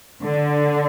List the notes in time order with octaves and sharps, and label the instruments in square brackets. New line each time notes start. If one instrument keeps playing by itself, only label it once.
[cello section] D3